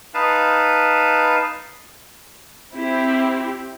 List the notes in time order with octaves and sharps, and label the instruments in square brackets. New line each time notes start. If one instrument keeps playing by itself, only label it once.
[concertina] D#4 B4 F5 A5
[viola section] C4 E4 G4